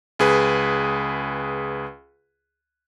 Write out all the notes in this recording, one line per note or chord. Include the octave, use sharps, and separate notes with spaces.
C#2 G#4 B4